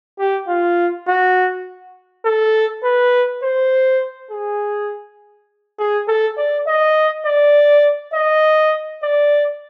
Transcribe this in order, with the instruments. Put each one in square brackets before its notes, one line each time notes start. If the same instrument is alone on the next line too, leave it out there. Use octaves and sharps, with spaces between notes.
[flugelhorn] G4
F4
F#4
A4
B4
C5
G#4
G#4
A4
D5
D#5
D5
D#5
D5